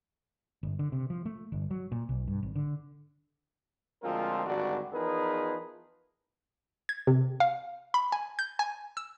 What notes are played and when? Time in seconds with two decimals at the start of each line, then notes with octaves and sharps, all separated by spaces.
0.63 G1
0.79 D3
0.92 C3
1.10 F3
1.25 A3
1.52 G1
1.71 F#3
1.92 A#2
2.09 B1
2.28 G2
2.43 G#1
2.55 D3
4.02 D2 F3 G#3 C4 F4 A#4
4.46 G#1 D2 G2 D4 F#4
4.93 E2 F3 D#4 G#4 A#4 B4
6.89 G#6
7.07 C3
7.40 F5
7.94 B5
8.12 G#5
8.39 G6
8.59 G#5
8.97 E6